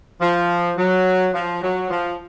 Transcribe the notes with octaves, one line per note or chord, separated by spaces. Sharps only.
F3
F#3
F3
F#3
F3